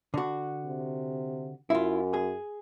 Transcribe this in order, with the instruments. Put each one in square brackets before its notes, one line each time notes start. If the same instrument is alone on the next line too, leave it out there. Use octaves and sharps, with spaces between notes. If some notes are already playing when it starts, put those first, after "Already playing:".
[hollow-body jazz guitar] D3 F#4
[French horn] C3
[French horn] F#2 [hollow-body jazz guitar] E4 F4
[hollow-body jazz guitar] G#4